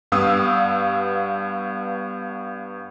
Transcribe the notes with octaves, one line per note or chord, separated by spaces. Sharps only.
G2 B3 F5 D#6 E6